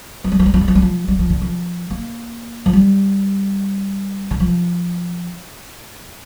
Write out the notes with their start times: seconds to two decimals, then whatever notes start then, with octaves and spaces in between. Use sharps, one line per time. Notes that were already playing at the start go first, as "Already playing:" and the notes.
0.24 F3
0.32 G3
0.39 F3
0.46 G3
0.54 F3
0.61 G3
0.68 F3
0.75 G3
0.82 F3
1.08 G3
1.19 F3
1.30 D3
1.41 F3
1.90 A#3
2.66 F3
2.73 G3
4.31 D3
4.40 F3